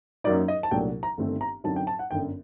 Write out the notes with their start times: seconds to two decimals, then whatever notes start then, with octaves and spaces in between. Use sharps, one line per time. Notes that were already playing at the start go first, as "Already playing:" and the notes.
0.24 F#2 F#3 A#3 D#4 D5
0.48 D#5
0.63 A5
0.71 C2 A#2 F#3 A3 D4 G5
1.03 A#5
1.18 G1 G2 D#3 A3 C4
1.41 A#5
1.64 F#2 D3 F#3 C4 D#4 A5
1.76 G5
1.87 A5
1.99 F#5
2.11 G1 F#2 D3 G5